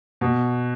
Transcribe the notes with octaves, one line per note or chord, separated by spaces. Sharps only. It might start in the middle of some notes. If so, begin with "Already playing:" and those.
B2